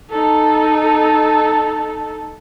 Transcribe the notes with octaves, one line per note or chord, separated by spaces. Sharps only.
D#4 A4